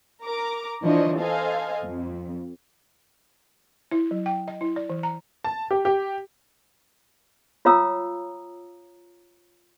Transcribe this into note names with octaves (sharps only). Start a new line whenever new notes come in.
A#4 A#5 D6
E3 F3 D4 C5 C#5 D#5
A4 C5 D#5 F5 G#5
F2
E4
F#3
G5
D#5
E4
D5
E3
A#5
A5
G4
G4
F4 C#5 F5 A#5 D#6 E6